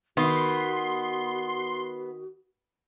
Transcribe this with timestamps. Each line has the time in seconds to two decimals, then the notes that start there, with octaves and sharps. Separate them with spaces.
0.17 D#3 B3 F#4 C6